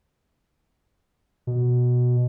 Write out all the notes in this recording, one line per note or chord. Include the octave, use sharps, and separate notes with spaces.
B2